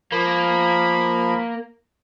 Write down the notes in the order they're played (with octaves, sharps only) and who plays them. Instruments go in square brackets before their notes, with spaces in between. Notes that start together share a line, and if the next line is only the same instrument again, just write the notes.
[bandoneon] F3 B5 [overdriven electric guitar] A#3